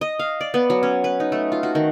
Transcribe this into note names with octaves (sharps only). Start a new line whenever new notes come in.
D#5
F5
D5
B3
F#3
C#4
B4
D#4
A3
F4
F#4
D#3